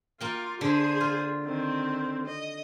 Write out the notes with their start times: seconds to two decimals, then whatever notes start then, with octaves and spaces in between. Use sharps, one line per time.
0.21 A#3 F4 G5
0.61 D3 G#4 C5
1.01 F4
1.44 D#3 C4
2.26 D#5